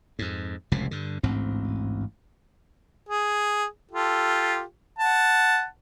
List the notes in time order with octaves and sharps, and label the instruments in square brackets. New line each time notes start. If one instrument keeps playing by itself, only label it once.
[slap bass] F2 G#2
F1 C#2 A2 C3
G2 D3
A1 D2 G#2 C4
[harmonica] G#4
F4 G4 A4
F#5 A5